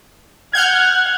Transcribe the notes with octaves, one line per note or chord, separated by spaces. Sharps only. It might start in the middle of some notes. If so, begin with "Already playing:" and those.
F#5 F6 G6 G#6